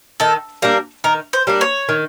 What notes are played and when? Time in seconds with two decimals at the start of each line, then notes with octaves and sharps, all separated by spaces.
0.20 D#3 A4
0.62 G3 A#3 D4 A#4
1.04 D#3 A#4
1.33 C5
1.47 G3 A#3 D4
1.61 C#5
1.89 D#3